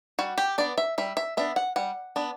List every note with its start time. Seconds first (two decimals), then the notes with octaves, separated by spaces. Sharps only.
0.19 G3 F#4
0.38 G4
0.58 B3 D4 D5
0.78 E5
0.98 G3 E5
1.17 E5
1.37 B3 D4 E5
1.56 F#5
1.76 G3 F#5
2.16 B3 D4